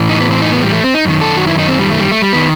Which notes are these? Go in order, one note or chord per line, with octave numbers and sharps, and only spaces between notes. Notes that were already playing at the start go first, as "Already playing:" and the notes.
Already playing: A2 E3
D#4
B3
C4
D#4
B3
G3
A3
C4
D#4
F#2 D#3
A4
F#4
E4
D#4
C4
G3
A3
G3
A3
G3
D#3 B3